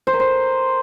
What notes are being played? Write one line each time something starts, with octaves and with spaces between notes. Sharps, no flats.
C5
A#4
C5